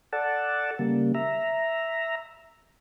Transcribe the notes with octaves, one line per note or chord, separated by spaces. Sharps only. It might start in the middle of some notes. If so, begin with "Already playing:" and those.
A4 D5 F#5 A5
C#3 G3 A#3
E5 A#5